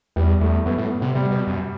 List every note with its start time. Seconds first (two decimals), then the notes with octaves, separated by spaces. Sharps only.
0.16 E2 G3
0.41 E2 A3
0.66 F#2 B3
0.78 A2
0.90 B3
1.02 C3
1.15 C3 G3
1.31 B2
1.47 F#2